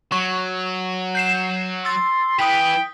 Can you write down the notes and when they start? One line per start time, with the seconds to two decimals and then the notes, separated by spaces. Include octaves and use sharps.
0.12 F#3 C#6
1.15 G6 C7 E7
1.85 C6 E6 A6
2.39 E3 B4 G5 D#6 B6